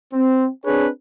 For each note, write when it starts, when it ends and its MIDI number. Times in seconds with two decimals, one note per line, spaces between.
0.13 0.46 60
0.65 0.87 60
0.65 0.87 62
0.65 0.87 68
0.65 0.87 71
0.65 0.87 73